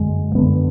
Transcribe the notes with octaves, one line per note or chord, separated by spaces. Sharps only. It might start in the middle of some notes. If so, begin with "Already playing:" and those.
Already playing: F#2 D3 G#3
F#2 D3 B3